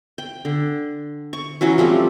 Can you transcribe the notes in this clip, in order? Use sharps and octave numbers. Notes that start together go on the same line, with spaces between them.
G5
D3
C#6
E3 F#3 C#4 F#4
F3 G3 A3 C4